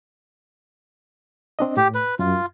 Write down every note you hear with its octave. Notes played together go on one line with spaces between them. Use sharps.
C4 D4 D#5
A2 G4
B4
F#2 F4